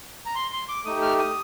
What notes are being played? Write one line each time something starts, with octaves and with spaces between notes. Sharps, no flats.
A#5
C6
C6
D6
A3 D#4 G4 D#6
F6
D#6